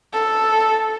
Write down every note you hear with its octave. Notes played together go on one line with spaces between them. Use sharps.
A4